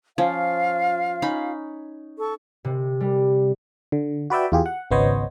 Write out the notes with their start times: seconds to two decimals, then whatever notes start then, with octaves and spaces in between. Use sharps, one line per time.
0.18 F3 C#4 F4 F5
1.22 C#4 D#4 B5
2.19 A4 C#6
2.65 C3
3.01 G3
3.92 D3
4.30 F#4 B4 D5 E5 G5
4.52 E2 F4 G4 G#4
4.66 F#5
4.91 G#1 C#2 B3 C5 C#5 D#5